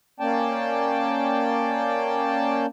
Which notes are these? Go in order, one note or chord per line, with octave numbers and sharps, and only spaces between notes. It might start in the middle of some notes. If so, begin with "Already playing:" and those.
A#3 C#4 D5 G5 A5